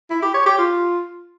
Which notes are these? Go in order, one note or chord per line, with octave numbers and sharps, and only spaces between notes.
E4
G4
C#5
G4
F4